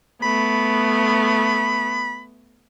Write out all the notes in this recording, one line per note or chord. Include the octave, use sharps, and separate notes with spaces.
A3 B3 B5